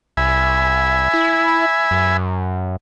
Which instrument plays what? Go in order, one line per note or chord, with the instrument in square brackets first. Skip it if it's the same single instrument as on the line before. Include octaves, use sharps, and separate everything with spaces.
[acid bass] C2 [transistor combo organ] E5 G#5 B5
[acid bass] E4
F#2